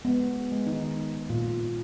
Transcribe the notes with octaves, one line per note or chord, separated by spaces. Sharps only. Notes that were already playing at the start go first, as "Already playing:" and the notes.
G#3 B3
G#3
G#3
G#3
D#3 D#4
D#3
D#3
D#3
A#2 F4
A#2
A#2